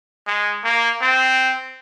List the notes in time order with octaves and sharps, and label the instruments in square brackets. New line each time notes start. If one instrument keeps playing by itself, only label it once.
[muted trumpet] G#3
A#3
C4